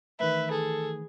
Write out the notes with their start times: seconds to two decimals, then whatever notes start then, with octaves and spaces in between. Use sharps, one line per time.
0.20 D#3 E3 A3 B4 E5
0.51 G#4 A4